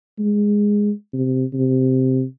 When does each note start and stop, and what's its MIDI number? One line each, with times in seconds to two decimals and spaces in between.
0.19 0.91 56
1.13 1.45 48
1.54 2.23 48